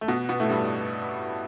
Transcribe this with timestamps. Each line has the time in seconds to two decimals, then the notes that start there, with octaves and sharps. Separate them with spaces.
0.01 A3
0.08 B2 B3
0.29 B2 B3
0.40 A2 A3
0.49 G2 G3